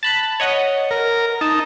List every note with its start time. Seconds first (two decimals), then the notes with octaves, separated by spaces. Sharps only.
0.03 A5 B5 F#6
0.40 C#5 D#5 F#5
0.91 A#4
1.41 D#4 A5